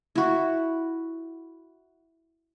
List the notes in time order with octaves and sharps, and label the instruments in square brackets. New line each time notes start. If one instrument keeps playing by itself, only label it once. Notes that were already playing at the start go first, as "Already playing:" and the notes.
[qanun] E4 F#4